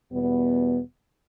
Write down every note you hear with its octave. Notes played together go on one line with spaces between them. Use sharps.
E2 B2 G3 B3